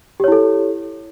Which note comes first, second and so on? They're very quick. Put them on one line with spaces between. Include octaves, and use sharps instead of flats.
G4 C#5 E4 A4